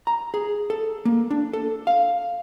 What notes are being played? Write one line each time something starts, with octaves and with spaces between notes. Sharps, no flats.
A#5
G#4
A4
A#3
D4
A4
F5